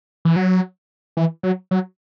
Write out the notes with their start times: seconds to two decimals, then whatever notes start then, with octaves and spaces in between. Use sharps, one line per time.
0.25 E3
0.36 F#3
1.17 E3
1.43 F#3
1.71 F#3